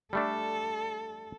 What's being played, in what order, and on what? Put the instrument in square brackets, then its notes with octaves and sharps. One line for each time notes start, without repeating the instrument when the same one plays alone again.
[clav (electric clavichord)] G3 A3 D4 [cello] A4